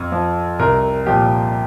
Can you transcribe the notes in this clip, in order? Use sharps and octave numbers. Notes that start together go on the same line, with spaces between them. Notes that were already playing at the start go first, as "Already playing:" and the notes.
Already playing: F2
F3
C2 A#4
A#2 F3 G4